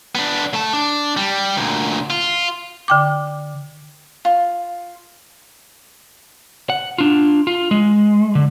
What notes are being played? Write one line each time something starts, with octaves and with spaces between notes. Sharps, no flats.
B3 D4
A3 A5
D4
G3
D2 A#2
F4
D3 G5 D6
F4
F#5
D4 F4
F4
G#3
D3